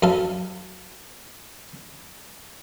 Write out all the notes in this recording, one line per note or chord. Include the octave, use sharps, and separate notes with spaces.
F#2 A4 F5 A5